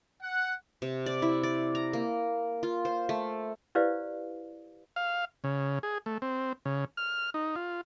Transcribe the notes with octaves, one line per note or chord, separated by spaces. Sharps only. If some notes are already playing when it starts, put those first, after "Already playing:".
F#5
C3
D5
E4
D5
A#5
A#3
F4
C5
A3
E4 G4 B4 C5 D5 F5
F5
C#3
G#4
A3
C4
C#3
F6
D#4
F4